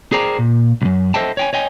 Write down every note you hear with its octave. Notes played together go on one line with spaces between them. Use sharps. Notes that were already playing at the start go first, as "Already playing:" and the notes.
G#4 A#4 C5 D5 G5 A#5
A#2
C2 F#2
A4 C5 D#5 E5 G5 A5
C#5 G5 G#5
C#5 D#5 G5 G#5